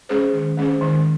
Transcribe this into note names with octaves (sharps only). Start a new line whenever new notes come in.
G#3 C#4 G#4 C5
D#3
G#3 C#4 G#4 C5
D#3